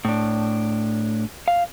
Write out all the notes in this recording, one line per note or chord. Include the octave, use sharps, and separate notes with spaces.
A2 D4
F5